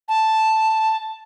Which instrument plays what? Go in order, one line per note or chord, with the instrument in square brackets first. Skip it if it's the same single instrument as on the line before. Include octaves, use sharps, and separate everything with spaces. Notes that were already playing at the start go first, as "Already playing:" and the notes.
[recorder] A5